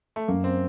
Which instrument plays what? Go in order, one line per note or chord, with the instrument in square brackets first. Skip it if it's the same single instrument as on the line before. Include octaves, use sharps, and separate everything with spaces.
[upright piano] A3
[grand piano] F#2 [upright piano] A#3
[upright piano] C4